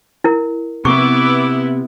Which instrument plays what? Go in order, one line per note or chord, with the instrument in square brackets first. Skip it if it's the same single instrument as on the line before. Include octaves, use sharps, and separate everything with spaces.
[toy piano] E4 A#4
[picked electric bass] C3 [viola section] B3 E4 [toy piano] C#6 [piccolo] D6